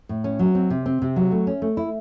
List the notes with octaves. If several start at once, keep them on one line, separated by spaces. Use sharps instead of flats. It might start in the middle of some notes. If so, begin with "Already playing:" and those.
A2
C#4
F#3
C4
C3
C4
C3
F#3
A3
C#4
A3
E4